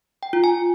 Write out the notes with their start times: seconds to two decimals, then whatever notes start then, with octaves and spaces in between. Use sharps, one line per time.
0.23 G5
0.33 F4
0.44 G#5